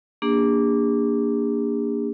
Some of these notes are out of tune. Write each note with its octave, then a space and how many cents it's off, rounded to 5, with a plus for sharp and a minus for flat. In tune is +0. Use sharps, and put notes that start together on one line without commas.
A#3 -5 D4 -10 G#4 -40